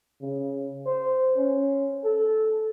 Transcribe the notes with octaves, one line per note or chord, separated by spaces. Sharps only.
C#3
C5
C#4
A4